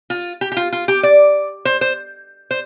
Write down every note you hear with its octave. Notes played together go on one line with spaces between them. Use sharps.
F4
G4
G4
F4
F4
G4
D5
C5
C5
C5